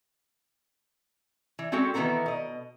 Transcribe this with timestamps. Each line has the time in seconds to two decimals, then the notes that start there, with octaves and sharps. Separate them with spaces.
1.59 E3
1.72 G#3 C4 C#4 F#4 A4 G5
1.94 D#3 E3 B3 A4 A#4 F#5
2.26 B2 D#5